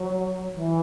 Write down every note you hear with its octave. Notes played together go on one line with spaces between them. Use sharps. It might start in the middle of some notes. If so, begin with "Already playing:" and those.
Already playing: F#3
E3